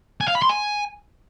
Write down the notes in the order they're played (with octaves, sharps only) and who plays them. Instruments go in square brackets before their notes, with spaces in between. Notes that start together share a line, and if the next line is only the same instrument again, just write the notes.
[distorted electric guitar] G#5
F5
B5
C6
G#5